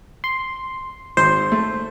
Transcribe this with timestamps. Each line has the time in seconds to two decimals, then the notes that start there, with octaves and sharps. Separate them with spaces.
0.24 C6
1.17 G#1 C5 C6
1.52 A3